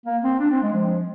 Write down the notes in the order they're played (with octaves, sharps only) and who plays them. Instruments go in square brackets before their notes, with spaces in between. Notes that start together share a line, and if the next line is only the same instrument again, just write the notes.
[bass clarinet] A#3
C4
D4
C4
G#3
F3